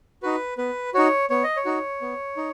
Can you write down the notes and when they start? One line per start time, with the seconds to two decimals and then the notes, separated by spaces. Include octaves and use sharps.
0.23 D#4 F#4 B4
0.58 B3 B4
0.94 D#4 F#4 C#5
1.30 B3 C#5
1.44 D#5
1.57 C#5
1.65 D#4 F#4
2.01 B3
2.37 D#4